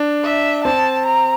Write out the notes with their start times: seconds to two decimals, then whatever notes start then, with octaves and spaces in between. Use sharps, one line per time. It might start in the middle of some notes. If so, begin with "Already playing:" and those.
Already playing: D4
0.24 E5
0.64 C4 A5
1.06 A#5